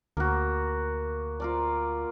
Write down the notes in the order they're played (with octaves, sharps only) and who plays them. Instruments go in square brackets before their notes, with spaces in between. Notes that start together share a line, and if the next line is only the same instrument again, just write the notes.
[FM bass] D2 [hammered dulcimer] A#3 F#4
[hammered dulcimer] F4 A#4 D5